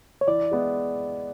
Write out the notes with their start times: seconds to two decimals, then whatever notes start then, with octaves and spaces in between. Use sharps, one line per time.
0.21 C#5
0.27 E3 D5
0.51 G#3 B3 E4